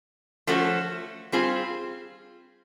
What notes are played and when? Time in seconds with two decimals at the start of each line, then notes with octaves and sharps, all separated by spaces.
0.47 F3 A3 C#4 F#4 A4
1.32 G3 C4 F4 G#4